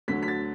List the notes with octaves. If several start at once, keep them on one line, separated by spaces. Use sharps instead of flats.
D2 D3 F#3 B6
B6
A6